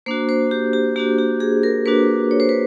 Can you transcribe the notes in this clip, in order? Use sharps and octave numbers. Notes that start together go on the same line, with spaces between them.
A#3 D4 F#4 C5
C5
G4
G4
A#3 D4 F#4 G4
G4
G#4
A#4
A#3 D4 F#4 B4
C#5
C5
B4